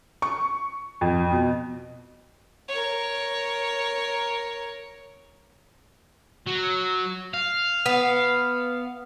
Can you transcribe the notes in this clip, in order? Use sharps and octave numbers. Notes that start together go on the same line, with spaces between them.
C#6
F2
B2
A#4 C#5
F#3
F5
B3